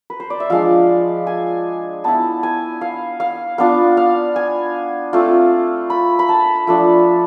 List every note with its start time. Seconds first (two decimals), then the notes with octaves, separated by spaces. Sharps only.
0.10 B4
0.20 C5
0.30 D5
0.40 E5
0.50 F3 G#3 D4 F5
1.27 G#5
2.04 B3 E4 A5
2.43 G#5
2.81 F5
3.20 F5
3.58 B3 D4 F4 F5
3.97 F5
4.36 G#5
5.13 A3 C4 F4
5.90 B5
6.19 B5
6.29 A5
6.67 F3 A3 D4